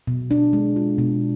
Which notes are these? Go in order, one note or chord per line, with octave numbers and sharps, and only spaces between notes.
B2
D4
G#3
F4
B2